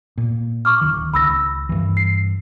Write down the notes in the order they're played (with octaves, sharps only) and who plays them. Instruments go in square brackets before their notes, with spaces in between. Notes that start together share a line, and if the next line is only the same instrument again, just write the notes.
[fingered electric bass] A#2
[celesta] C#6 D6 F6
[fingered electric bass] D1 D#3
[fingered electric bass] C#2 [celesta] B5 E6 A#6
[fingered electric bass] G2 E3
[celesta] C7